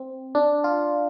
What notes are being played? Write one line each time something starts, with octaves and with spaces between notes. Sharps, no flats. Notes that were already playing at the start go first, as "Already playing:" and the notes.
Already playing: C4
D4
F4